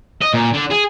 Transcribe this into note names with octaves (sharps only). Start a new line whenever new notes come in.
D#5
A#2
D3
G#4